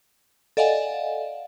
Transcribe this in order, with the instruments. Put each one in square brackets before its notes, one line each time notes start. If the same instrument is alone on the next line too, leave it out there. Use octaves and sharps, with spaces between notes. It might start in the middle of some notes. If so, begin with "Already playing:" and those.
[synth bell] A4 D5 D#5 F5 F#5 G#5